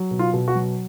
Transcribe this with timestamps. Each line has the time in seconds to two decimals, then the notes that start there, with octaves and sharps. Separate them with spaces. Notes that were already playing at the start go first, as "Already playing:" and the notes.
Already playing: F#3
0.11 B2
0.19 F4
0.33 B2
0.48 F#4
0.55 F#3